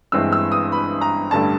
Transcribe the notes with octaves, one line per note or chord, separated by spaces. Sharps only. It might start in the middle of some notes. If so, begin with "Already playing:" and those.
G1 G2 E3 G#3 C4 E6
E6
D#6
B5
A#5
A1 G2 D3 G3 A5